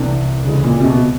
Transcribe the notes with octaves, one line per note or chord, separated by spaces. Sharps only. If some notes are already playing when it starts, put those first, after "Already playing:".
Already playing: C2 C3 E3 A3 D4
D2 C#3 E3 G#3
A#2
C3
B2